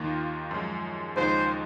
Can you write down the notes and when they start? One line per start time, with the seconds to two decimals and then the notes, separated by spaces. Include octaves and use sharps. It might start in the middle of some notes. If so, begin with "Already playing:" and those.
Already playing: D#2 D#3 A#3 F4
0.51 F#2 F3 G#3
1.16 D#2 C#3 F3 G#3 D#4 C5